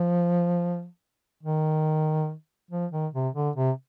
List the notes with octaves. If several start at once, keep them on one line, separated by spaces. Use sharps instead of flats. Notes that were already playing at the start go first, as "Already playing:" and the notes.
Already playing: F3
D#3
F3
D#3
C3
D3
C3